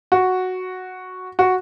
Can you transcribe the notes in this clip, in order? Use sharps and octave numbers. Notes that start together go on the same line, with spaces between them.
F#4
F#4